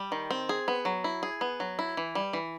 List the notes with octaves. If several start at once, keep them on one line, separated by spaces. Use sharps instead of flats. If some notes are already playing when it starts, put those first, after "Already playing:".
Already playing: G3
D#3
C4
G#4
B3
F#3
E4
G#4
B3
F#3
E4
E3
G3
E3